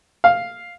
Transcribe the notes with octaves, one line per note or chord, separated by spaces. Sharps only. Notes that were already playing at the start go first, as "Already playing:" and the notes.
F5